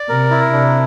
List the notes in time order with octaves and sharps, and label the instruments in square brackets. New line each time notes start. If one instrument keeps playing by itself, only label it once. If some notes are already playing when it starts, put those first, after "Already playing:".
Already playing: [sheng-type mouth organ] D5
[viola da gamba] C3 [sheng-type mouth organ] A#4
[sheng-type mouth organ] E4
[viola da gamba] C3 [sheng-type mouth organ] D4